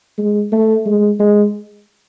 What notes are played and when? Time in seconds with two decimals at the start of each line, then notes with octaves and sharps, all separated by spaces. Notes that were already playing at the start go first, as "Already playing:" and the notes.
0.18 G#3
0.52 A3
0.86 G#3
1.19 G#3